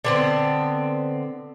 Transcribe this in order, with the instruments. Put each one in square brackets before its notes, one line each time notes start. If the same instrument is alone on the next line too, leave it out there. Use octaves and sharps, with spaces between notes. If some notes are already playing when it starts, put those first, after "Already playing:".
[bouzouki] D3 B3 C4